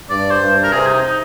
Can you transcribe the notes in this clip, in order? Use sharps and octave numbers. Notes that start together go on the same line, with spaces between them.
G2 D5
C5
G2
A#4
C3 G#4
D#4
D#4